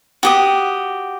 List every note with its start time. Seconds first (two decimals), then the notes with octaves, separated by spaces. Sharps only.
0.23 F#4 G4 D#6